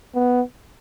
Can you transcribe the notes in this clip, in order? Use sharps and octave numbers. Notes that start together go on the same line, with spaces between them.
B3